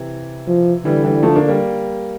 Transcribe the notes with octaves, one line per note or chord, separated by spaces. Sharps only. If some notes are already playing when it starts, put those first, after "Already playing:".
Already playing: C3 E3
F3
D3 E3 G3
E3 G3
F3 A3
A#3 D4
G3 A#3